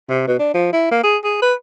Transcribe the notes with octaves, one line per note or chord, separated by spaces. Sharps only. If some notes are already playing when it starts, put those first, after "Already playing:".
C3
B2
D4
F3
E4
A#3
G#4
G#4
B4